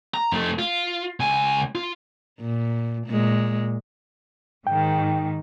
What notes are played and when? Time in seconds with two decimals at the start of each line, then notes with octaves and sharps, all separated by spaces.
0.14 A#5
0.32 F2 A3
0.59 F4
1.20 C#2 G#5
1.75 F4
2.40 A#2
3.07 A#2 G#3
4.67 G#2 D#3 G5